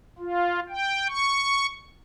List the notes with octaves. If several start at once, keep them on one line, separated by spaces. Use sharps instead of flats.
F4
G5
C#6